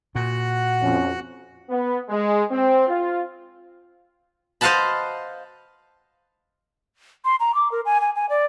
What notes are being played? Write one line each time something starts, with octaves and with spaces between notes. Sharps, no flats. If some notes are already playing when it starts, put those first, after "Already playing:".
A#2 F#4 F#5
F2 C#4
B3
G#3
C4
F4
C5 D#5 F5 F#5 A5 B5
C6
A#5
D6
A#4
G#5
G#5
G#5
D5